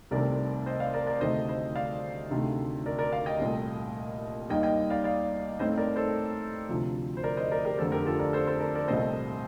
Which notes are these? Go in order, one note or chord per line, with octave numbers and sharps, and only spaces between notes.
C2 C3 D#3 A3 C4 A#4 D5
C5 D#5
D5 F5
A#4 D5
A#4 D5
D2 C3 D#3 A3 D4 C5 D#5
C5 D#5
D5 F5
D2 C3 D#3 A3
A#4 D5
A#4 D5
D5 F5
D#5 G5
C2 A#2 A3
D#2 D#3 G3 A#3 D#4 D#5 G5
D#5 G5
D5 F5
D5 F5
A2 A3 C4 D#4 C5 D#5
A#4 D5
A4 C5
D2 C3 F3
C5
A#4 D5
C5 D#5
A#4 D5
G4 A#4
F2 D3 A3 A4 C5
G4 A#4
F4 A4
A#4 D5
A4 C5
A4 C5
A#4 D5
A#4 D5
C2 A#2 A3 C4 C5 D#5